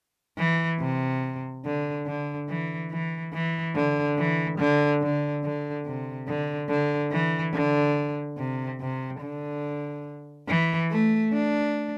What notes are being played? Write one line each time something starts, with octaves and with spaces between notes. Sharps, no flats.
E3
C3
D3
D3
E3
E3
E3
D3
E3
D3
D3
D3
C3
D3
D3
E3
D3
C3
C3
D3
E3
A3
D4